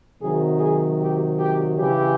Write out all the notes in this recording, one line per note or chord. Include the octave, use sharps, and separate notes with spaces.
C3 D#3 F#3 G#4
G#4
G4
G4
C#3 E3 G4